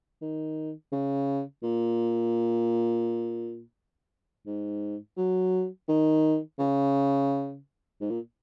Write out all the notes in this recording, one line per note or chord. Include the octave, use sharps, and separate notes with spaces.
D#3
C#3
A#2
G#2
F#3
D#3
C#3
G#2
A#2